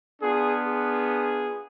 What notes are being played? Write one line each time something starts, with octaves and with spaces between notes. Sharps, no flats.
B3 D4 F4 G#4
G#4